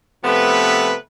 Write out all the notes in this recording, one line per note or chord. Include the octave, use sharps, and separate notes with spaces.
C3 F3 A3 B3 B4 A5